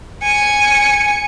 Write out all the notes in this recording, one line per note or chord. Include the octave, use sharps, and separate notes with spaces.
G#5 C#7